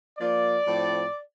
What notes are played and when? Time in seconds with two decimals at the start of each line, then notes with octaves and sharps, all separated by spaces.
0.19 F3 A#3 F4 D5
0.66 A2 F3 C4